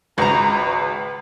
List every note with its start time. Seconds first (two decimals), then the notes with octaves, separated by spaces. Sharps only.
0.18 G#1 C#2 F#4 B4 A#5